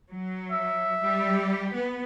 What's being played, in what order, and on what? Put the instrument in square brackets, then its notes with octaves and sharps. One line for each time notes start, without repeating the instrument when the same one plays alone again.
[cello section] F#3
[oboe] E5
[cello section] G3 G4
B3